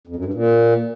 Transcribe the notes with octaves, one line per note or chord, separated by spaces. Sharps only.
F2
F#2
G2
A#2